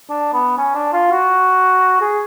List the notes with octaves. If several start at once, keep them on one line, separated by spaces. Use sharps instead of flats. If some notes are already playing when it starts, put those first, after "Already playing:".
D4
B3
C#4
D4
F4
F#4
G#4